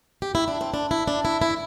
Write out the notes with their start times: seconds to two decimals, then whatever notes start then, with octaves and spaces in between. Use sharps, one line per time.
0.22 G4
0.35 E4
0.48 D4
0.61 C4
0.74 D4
0.91 E4
1.08 D4
1.25 E4
1.42 E4